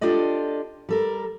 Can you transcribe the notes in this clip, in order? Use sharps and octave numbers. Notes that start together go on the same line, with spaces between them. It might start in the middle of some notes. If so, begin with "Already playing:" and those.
D4 F4 G4 A4 D5 D#5
G3 A4 A#4